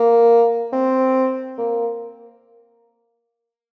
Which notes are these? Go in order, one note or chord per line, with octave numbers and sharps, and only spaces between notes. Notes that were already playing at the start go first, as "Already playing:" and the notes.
Already playing: A#3
C4
A#3